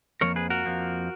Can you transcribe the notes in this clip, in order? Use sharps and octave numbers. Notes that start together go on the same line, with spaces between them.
F2 F3 A#3 A#4 C#5
G#4 B4
F#4 A#4
F2 F3 A#3